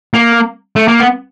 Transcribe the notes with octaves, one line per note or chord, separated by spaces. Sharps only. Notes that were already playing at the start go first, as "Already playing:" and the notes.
A#3
A3
A#3
B3